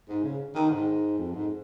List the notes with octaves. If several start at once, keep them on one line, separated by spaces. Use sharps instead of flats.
G#2
C#3
D#3
G#2
F2
G#2